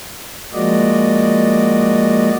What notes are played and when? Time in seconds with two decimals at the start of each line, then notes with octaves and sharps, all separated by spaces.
0.53 F3 G#3 A#3 F#4 D5 D#5